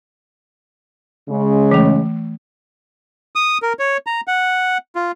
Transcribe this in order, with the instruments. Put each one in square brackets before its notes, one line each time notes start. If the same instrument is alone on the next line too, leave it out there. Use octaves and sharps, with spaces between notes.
[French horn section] C#3 G#3
[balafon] E3 A3
[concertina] D#6
A#4
C#5
A#5
F#5
F4